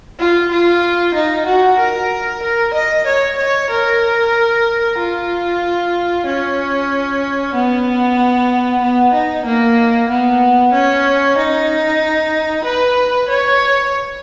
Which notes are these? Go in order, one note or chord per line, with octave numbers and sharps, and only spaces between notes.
F4
F4
D#4
F#4
A#4
A#4
D#5
C#5
C#5
A#4
F4
C#4
B3
B3
D#4
A#3
B3
C#4
D#4
B4
C#5